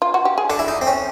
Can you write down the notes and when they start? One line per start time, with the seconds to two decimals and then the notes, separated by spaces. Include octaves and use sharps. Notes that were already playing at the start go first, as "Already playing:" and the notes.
0.02 F4
0.14 F#4
0.25 G4
0.38 G#4
0.49 D4 A4
0.59 E4
0.68 D#4
0.81 C4
0.87 C#4